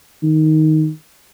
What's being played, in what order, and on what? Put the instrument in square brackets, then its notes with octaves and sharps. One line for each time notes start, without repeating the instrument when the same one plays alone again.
[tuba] D#3